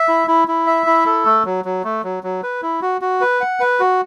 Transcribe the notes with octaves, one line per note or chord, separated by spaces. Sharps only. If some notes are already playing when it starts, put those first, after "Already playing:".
Already playing: E5
E4
E4
E4
E5
E4
A4
A3
F#3
F#3
A3
F#3
F#3
B4
E4
F#4
F#4
B4
F#5
B4
F#4